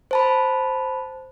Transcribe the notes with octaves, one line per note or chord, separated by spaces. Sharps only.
C5 A5 B5